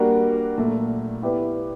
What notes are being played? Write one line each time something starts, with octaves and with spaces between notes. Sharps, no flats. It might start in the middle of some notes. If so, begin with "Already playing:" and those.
Already playing: G3 A#3 D4 F#4 A#4
A#2 F#3 A3
B3 E4 G4 B4 D5